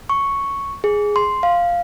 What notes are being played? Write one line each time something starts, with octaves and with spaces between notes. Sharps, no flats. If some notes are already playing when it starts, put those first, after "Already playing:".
C#6
G#4
C6
F5